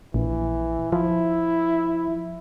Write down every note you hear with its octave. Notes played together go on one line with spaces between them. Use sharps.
A#1 E3
F3 E4